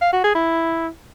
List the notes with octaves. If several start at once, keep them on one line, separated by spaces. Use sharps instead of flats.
F5
F#4
G#4
E4